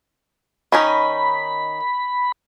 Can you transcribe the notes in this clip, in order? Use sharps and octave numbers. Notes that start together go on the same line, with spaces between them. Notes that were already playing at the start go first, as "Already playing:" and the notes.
D#3 C#4 D#4 B5